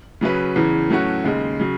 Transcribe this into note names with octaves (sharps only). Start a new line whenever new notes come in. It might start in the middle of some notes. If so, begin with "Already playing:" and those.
C#3 F#3 C#4 G#4 B4
E2 C#3 E3
A2 F#3 A3 C#4 F#4
D#2 C#3 G#3
C#3 F#3